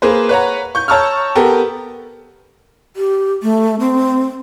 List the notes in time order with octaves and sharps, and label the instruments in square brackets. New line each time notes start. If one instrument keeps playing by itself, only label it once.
[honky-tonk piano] A#3 G#4 B4 C5
B4 C#5 F#5 A#5
C#6 G6
C#5 A5 A#5 C#6 E6 F6
B3 G4 A4 A#4
[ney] G4
A3
C4